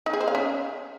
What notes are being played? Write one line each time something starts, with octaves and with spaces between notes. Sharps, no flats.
D#4
G#4
C5
F5
C#4